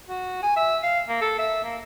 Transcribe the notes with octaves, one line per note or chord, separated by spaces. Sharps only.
F#4
G#5
E5
F5
A#3
A4
E5
A#3